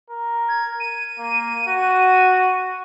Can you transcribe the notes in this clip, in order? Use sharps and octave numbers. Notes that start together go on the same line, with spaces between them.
A#4
G#6
D#7
A#3
F#4